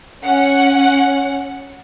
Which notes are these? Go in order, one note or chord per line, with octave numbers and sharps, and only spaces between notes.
C#4 F#5